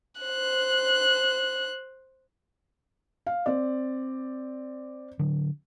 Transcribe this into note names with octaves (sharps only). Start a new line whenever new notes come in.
C5 F#6
F5
C4 D5
D3 F#3